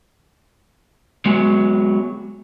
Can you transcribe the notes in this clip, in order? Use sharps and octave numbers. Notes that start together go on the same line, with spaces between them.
F#3 G#3 B3